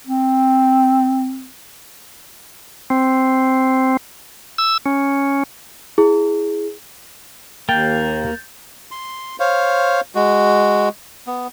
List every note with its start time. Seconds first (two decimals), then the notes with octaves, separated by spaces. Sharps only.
0.07 C4
2.90 C4
4.58 E6
4.86 C#4
5.98 E4 G#4
7.69 D#2 A#3 G5 G6 A6
8.91 C6
9.40 C5 C#5 F5
10.15 G#3 F#4
11.27 B3